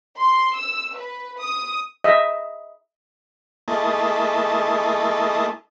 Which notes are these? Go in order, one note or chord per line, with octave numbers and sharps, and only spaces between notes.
C6
E6
B4
D#6
D#5 E5
A3 A#3 E4 G#4 D#5 A5